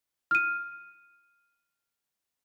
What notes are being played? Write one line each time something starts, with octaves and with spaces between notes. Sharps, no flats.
F6 D#7